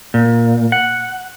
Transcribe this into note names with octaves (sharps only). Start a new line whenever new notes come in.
A#2
F#5